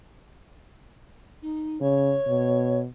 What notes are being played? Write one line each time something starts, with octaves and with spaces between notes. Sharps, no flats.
D#4
C#3 C#5
B2